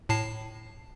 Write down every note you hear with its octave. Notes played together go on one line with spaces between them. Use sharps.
A2 A5 C7